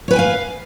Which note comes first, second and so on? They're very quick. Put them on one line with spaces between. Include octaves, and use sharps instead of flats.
C#5 B4 G#5 G5 F5